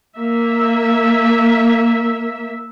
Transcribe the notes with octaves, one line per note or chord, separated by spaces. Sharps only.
A#3 E5